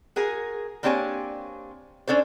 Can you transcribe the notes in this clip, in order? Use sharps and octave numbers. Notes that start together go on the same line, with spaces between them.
F#4 G#4 A#4
A#3 C4 D4 G4 C#5 G#5
C#4 D4 A4 C5